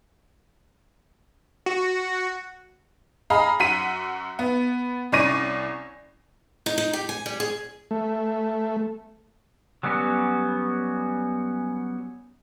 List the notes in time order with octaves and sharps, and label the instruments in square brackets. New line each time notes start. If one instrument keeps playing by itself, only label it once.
[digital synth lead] F#4
[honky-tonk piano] G#4 D#5 F5 A#5 B5
F#2 F#4 B6 D#7
B3
C2 C#4 D5 C#6 A#6 D#7
[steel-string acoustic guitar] D#4
D#4
G4
G#5
G3
G#4
[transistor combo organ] A3
[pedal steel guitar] F#3 G3 B3 C#4 F#4